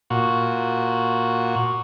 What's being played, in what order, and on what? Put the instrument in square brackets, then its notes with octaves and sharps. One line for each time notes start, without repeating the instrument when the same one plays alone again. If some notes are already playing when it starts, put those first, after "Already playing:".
[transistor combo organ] A#2 F#4